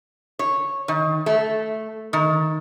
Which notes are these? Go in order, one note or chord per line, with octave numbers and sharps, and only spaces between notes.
C#5
D#3
A3
D#3